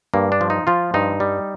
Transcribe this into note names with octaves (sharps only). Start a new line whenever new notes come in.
G2 A#3
D4
F3
D#4
F3 F4
G2 D#4
G3